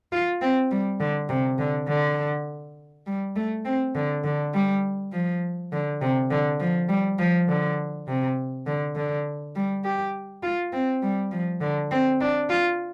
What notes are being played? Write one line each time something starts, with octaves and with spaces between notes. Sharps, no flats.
F4
C4
G3
D3
C3
D3
D3
G3
A3
C4
D3
D3
G3
F3
D3
C3
D3
F3
G3
F3
D3
C3
D3
D3
G3
G4
F4
C4
G3
F3
D3
C4
D4
F4